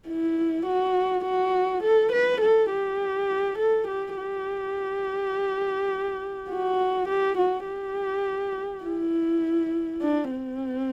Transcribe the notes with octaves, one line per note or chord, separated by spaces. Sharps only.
E4
F#4
F#4
A4
B4
A4
G4
A4
G4
G4
F#4
G4
F#4
G4
E4
D4
C4